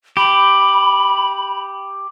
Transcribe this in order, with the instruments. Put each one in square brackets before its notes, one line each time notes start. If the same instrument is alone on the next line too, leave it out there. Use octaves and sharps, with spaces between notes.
[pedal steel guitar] G4 [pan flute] B5